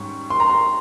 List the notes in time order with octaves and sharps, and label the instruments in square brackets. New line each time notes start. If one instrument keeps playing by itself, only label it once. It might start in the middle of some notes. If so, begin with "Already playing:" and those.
Already playing: [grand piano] G#2 D#3 G3 C#4 [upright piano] C#6
[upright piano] C6
A#5
C6